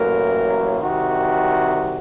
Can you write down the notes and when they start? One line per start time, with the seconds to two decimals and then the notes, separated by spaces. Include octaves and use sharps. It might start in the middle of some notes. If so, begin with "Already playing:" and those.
Already playing: A1 A2 F#3 A#3 A#4
0.81 C2 C3 D#3 F#4